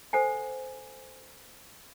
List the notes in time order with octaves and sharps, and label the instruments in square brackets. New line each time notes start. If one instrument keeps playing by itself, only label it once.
[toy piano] A4 C5 F#5 G#5